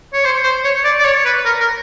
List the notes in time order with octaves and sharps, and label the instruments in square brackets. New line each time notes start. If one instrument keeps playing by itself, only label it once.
[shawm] C#5
C5
C5
C#5
D5
D5
C#5
B4
A#4
A#4